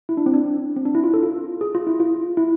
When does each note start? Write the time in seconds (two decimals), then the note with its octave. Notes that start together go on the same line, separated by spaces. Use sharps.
0.09 E4
0.17 D4
0.26 C4
0.34 D4
0.76 C4
0.85 D4
0.95 E4
1.04 F4
1.14 A4
1.23 F4
1.61 G#4
1.75 F4
1.87 E4
2.00 F4
2.37 E4